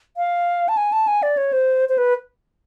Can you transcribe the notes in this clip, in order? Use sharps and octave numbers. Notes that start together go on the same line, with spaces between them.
F5
A5
G#5
A5
G#5
D5
C#5
C5
C5
B4